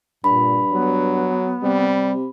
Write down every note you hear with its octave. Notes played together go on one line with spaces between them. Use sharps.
G2 A#2 B5
F#3 B3
C3 G3